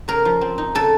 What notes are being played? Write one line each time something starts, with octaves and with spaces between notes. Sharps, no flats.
C#3 A#4
F3
C4
D#4
C#3 A4